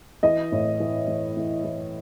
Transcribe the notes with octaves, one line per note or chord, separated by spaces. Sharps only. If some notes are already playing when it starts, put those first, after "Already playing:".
E3 D#5
A2
E3
E3
E3
E3